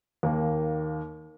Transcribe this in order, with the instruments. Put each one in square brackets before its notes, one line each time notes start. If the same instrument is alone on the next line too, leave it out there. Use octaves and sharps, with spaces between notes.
[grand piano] D#2 D#3 A#3